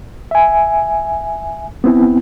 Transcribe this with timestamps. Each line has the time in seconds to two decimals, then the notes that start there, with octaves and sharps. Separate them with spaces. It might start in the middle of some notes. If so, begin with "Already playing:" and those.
0.31 E5 G#5
1.84 B3 C4 E4